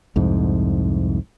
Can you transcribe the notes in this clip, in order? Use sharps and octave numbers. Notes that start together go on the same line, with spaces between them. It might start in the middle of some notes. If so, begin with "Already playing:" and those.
C2 F2 G#2